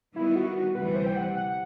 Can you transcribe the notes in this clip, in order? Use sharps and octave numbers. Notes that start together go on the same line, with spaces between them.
D#3 G3 B3 E4
F#4
F#4
D2 C3 E3 G3 B4
C5
G5
F#5
F#5